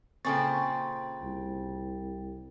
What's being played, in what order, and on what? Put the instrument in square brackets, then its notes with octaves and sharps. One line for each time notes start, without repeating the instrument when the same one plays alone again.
[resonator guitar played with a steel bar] A#2 C#3 C4 [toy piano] A4 G#5 C#6 [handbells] G5 A6
[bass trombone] C2